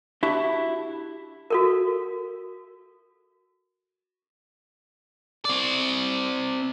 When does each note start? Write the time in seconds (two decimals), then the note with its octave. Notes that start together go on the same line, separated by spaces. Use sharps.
0.23 D4 E4 F#4 G4 E5 A5
1.50 F#4 A4 A#4
5.45 C4 D5